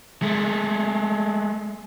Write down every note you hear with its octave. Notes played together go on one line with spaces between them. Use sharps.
G#3 A3